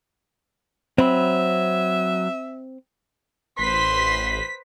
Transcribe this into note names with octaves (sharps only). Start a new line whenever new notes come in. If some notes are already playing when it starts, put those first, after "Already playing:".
F#3 C4 E5 B5
A1 B4 C5 C6 B6